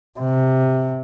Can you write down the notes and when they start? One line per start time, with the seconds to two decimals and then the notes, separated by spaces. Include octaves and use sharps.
0.20 C3